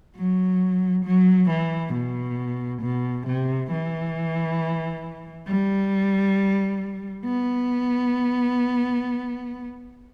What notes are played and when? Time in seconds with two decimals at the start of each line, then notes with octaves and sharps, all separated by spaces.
0.16 F#3
1.05 F#3
1.50 E3
1.93 B2
2.82 B2
3.27 C3
3.72 E3
5.48 G3
7.26 B3